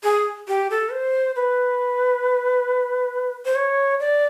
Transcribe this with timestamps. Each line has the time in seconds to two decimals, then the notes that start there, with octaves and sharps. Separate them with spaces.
0.03 G#4
0.48 G4
0.71 A4
0.92 C5
1.36 B4
3.45 C5
3.55 C#5
4.00 D5